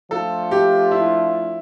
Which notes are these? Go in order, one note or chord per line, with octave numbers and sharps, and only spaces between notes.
F3 A3 D4 F4 A4
G4
E4